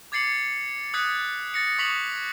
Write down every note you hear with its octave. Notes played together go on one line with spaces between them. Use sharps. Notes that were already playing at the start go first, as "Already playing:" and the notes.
D6 G#6 A6 C7 C#7 F#7
D#6 F#6 G#6 A6 B6 C#7
A6 A#6 C#7
C#6 D#6 B6 F7 F#7